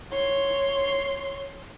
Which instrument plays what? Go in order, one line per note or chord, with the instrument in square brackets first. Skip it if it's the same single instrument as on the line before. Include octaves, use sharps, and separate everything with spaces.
[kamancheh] C#5 C6